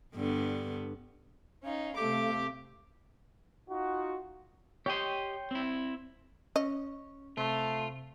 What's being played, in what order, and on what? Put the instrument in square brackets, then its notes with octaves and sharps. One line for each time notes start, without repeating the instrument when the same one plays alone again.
[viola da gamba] G2 D3 B3
[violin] C#4 D#4 [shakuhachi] F5
[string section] C3 A3 C4 [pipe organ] G4 [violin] D6
[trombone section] D#4 F4 F#4
[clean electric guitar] G4 D#5 [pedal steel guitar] C#5 G5 C6
[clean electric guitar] C4 E4
[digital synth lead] C#4 [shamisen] D#5
[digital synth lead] C3 [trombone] A3 [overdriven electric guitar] F4